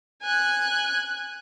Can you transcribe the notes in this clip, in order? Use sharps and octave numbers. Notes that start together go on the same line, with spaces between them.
G#5 F#6